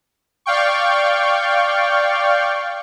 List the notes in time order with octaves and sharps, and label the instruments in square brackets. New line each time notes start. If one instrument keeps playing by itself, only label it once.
[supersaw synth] D5 F5 G5 C#6